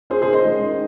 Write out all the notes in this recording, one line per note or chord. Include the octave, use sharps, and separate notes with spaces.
C#4 G#4 C5
G#4 C5
D#3
C5 D#5
G#3
D#3